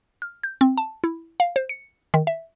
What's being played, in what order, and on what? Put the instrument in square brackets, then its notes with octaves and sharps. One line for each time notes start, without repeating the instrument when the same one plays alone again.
[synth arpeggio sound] F6
G6
C4
A5
E4
F5
C5
C#7
D#3
E5